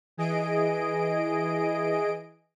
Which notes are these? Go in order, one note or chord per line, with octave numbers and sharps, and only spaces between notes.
E3 G#4 D#5 D7